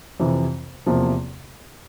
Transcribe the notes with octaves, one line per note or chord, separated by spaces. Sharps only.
F2 C3 E3
E2 C3 F3 A#3